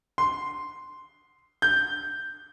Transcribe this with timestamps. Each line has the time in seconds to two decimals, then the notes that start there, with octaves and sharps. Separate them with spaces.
0.18 C6
1.62 G6